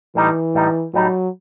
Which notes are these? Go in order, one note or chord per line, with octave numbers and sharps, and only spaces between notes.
A2 E3 G3 D#4
A2 G3 D#4
A2 F#3 G3 D#4